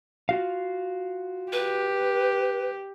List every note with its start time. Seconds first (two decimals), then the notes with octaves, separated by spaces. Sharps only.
0.29 F4 F#4 F5
1.52 G4 B4